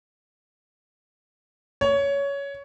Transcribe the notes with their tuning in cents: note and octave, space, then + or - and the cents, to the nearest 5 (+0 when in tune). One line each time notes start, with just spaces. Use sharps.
C#5 +15